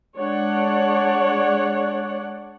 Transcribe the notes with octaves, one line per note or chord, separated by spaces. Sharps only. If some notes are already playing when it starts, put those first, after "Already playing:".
G#3 D4 C#5 D5 F#5